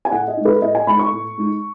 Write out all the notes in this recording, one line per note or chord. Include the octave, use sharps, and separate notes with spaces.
G#5
A2 F#5
D#5
G#3 D#4
B4
A2 D#5
G#5
G#3 D#4 B5
C#6
A2
G#3 D#4